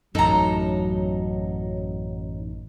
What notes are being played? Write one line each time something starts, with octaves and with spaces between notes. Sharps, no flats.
A1 F#2 F#3 D#4 A4 A#5